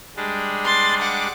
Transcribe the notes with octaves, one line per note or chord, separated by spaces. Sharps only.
G3 G#3 D4
C6 A6
F#5 D6